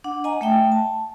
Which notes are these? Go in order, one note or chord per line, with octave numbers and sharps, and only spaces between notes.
D4 F#5
D#5 G#5 A#5
A3 E5 G5
A5